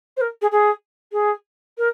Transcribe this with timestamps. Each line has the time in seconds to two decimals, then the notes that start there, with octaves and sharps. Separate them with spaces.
0.17 C5
0.21 A#4
0.41 G#4
0.51 G#4
1.12 G#4
1.78 A#4